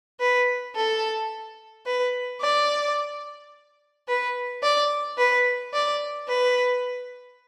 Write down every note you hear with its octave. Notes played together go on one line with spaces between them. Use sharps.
B4
A4
B4
D5
B4
D5
B4
D5
B4